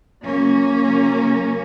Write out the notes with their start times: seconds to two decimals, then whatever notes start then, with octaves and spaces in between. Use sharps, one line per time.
0.23 C#3 F#3 A#3 C#4
0.82 C#3 F#3